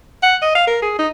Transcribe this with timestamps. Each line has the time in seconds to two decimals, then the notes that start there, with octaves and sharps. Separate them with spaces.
0.23 F#5
0.42 D#5
0.55 F5
0.67 A#4
0.82 G#4
0.99 D#4